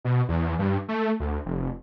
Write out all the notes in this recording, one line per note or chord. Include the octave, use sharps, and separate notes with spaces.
B2
E2
G2
A3
D2
F1